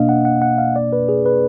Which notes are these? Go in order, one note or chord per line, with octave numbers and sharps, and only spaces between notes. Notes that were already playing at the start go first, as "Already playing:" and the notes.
Already playing: B2 A#3 D4 D#5 F5
F#5
F#5
F#5
F5
D5
B4
G#4
B4